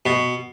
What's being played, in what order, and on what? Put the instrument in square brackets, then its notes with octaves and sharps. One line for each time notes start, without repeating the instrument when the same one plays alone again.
[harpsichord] B2